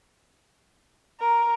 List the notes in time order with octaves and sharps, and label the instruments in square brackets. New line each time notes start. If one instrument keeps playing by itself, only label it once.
[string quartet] A#4